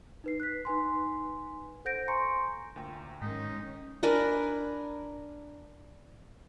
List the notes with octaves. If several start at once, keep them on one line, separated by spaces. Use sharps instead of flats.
D#4 B4 C7
F#6 B6
D#4 B4 G#5 C6
A4 C5 F#5 G6 A#6 D7
G#5 A#5 C6 C#6 C#7
D2 A#2 G5
G#2 D#3 G#3 C#4 D#4 B6
D4 A#4 B4 G#5